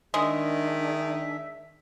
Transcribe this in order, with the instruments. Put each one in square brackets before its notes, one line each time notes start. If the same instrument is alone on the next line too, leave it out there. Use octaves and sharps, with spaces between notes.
[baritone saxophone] D#3 [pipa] G#3 [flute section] D4 G#4 [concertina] E5